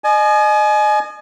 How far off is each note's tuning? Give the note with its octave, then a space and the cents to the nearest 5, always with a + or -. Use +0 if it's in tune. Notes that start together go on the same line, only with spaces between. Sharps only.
D#5 -35 G#5 +30